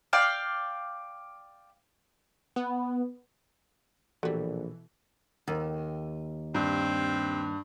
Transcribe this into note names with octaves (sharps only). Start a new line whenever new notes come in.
D5 F5 G5
B3
A#1 B2 E3 F#3 G3 A4
D#2
G2 C4